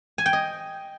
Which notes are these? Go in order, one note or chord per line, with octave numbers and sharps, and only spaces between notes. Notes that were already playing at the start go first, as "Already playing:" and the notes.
G#5
G5
D#5